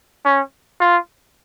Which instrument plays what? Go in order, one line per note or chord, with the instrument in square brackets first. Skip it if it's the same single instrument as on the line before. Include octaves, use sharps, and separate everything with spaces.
[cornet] C#4
F4